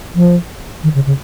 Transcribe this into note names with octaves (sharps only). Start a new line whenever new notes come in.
F3
D#3
C#3
C#3